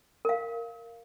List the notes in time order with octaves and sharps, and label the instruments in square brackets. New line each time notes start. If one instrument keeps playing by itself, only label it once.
[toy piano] A#4 F5